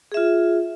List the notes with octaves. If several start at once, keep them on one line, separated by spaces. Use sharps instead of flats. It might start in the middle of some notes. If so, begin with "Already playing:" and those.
F4 G#4 E5